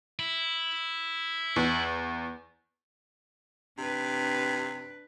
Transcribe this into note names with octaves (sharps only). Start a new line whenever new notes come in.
E4
E2
C3 D4 B4